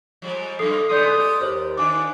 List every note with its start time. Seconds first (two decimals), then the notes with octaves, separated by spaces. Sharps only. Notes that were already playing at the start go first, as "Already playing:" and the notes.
0.22 F3 G3 G#3
0.59 F#2 F3 A4 D#6 C7
0.90 C#3 G#3 B3 A4 D5 C6 D#6 G6
1.20 G4
1.41 D#2 C5 C#5
1.77 D#3 D4 F4 G#5 D6